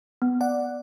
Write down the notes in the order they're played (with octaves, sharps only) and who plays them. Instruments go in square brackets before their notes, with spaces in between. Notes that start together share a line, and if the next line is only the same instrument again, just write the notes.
[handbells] B3
[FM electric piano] D5 F#5